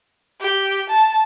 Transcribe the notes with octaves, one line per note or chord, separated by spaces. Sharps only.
G4
A5